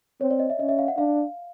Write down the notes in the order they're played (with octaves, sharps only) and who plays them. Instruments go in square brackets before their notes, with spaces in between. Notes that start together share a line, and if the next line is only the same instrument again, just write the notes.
[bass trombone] C4 [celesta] C#5
[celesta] D5
D#5
E5
[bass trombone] C#4 [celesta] D#5
[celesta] E5
F5
F#5
[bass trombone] D4 [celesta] F5